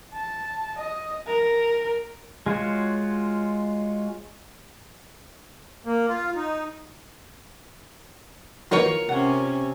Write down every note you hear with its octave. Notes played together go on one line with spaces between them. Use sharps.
A5
D#5
A#4
G#3 F4 F#4 C#5
A#3
F4
D#4
D#2 E3 F#3 F4 A#4 C#5
C3 C#4 F#5